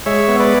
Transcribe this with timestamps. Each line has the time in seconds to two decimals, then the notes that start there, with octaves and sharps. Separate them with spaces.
0.06 G#3 C#5 E5
0.28 B3
0.40 B4 D5